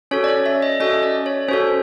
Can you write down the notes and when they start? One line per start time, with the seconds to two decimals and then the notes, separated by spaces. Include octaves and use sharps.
0.11 C#4 F#4 A4 C#5
0.24 D5
0.29 C#5
0.46 E5
0.62 D#5
0.80 C#4 F#4 A4 D#5
1.03 D5
1.26 C#5
1.49 C#4 C5
1.51 F#4 A4